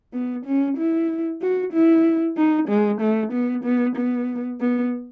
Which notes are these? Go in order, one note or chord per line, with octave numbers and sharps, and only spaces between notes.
B3
C#4
E4
F#4
E4
D#4
G#3
A3
B3
B3
B3
B3